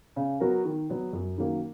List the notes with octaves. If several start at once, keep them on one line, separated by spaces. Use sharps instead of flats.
C#3
F#3 B3 F#4 A#4
D#3
F#3 B3
F#2
D#3 F#3 A#3 C#4